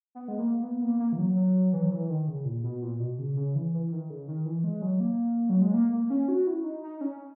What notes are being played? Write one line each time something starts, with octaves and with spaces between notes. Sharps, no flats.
B3
G#3
A#3
B3
A#3
A#3
E3
F#3
F#3
E3
F#3
E3
D#3
C#3
A#2
B2
A#2
B2
C#3
C#3
E3
E3
D#3
C#3
D#3
E3
G#3
F#3
A#3
F#3
G#3
A#3
A#3
C#4
F#4
E4
D#4
D#4
D#4
C#4